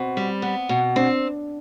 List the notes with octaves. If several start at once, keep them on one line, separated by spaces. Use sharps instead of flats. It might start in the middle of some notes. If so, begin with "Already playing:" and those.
Already playing: B2 C4
G3
B3
B2
C4 D4